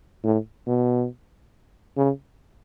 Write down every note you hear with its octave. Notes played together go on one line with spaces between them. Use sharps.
A2
B2
C#3